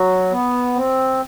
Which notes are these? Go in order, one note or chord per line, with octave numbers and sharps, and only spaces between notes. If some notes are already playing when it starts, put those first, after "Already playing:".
Already playing: F#3
B3
C4